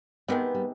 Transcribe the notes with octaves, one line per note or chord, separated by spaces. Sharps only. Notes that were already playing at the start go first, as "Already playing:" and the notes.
C3 D#3 G#3 B3
G3